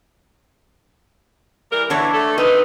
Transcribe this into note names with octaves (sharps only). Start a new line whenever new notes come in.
E3 G3 A#4
D3 E3 D4 C#5
A3 A4
D#3 C4 D#4 B4